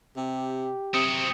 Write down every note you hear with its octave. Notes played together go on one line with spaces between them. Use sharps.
C3 G4
C3 F#3 C4 D#6 C#7